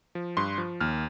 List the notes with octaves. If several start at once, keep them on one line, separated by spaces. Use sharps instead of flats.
F3
G2 C6
F3
D#2 F6